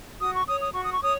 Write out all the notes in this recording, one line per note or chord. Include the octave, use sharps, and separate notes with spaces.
F#4 D#6
C#6
C#5 D#6
D#6
F#4 C#6
D#6
C#6
C#5 D#6